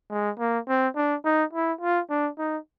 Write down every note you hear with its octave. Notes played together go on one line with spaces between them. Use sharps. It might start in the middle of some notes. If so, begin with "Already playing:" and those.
G#3
A#3
C4
D4
D#4
E4
F4
D4
D#4